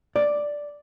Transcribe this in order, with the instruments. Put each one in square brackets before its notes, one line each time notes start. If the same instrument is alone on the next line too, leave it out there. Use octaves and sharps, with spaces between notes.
[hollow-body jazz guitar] D5